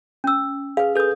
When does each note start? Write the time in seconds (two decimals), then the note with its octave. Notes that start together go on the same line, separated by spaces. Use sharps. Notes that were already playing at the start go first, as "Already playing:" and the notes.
0.24 C#4 E6
0.77 G#4 B4 F5
0.96 G#4 A4 B4 D#6 G6